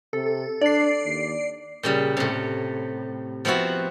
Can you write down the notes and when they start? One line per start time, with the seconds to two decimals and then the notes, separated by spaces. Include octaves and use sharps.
0.13 C3 A4
0.61 D4 D5 C7
1.05 D#2
1.83 A#2 C#3 G3
2.17 A2 C3
3.45 F3 B3 C4 E4 F#4